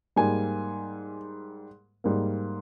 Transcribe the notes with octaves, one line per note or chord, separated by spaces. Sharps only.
G#2 G3 A#3 G#5
G#2 G3 A#3